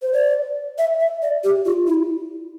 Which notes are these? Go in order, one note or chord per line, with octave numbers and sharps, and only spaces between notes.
C5
D5
E5
E5
D5
G4
F4
E4